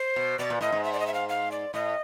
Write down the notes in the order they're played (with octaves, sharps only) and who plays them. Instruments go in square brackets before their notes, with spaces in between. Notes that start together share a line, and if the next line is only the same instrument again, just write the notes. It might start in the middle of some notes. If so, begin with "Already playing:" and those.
Already playing: [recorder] C5
[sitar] B2
[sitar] B2 [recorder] D5
[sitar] A#2
[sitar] A2 [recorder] D#5
[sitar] G#2
[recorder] E5
D5
D#5
E5
F5
F5
D5
[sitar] A2 [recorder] D#5